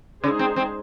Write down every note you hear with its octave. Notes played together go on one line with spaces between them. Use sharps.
C#3 G#3 D#4 G#4 C5
C4
C4